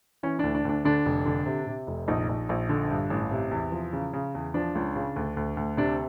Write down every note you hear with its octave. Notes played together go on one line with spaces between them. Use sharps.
E3 C#4
D2 D4
D4
D2 D4
D3 D4
F1
D3
C3
C3
F1
A#1 D#4
A#1
A#1
D3
G2
A1
C3
E2
F3
C#3
C#3
E2
F3 D4
C#2
C#3
D2
D2
D2
C3 D4